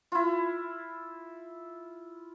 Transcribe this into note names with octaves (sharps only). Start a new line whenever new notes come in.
E4 F4